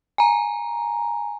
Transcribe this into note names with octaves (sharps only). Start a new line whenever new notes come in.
G#5 A#5